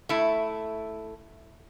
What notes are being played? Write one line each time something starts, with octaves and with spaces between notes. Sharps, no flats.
A3 E4